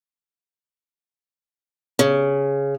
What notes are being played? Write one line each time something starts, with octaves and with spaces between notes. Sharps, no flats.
C#3